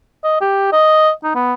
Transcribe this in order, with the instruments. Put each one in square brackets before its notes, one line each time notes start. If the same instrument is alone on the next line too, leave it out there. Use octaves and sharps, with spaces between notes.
[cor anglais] D#5
G4
D#5
D#4
B3